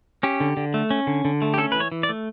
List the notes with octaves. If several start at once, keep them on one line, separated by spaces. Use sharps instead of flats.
C#4 G4
D3
D3
A3
C#4
D3
D3
A3
G4
C#4 A4
E3 B4
C#5
E3
D5
A3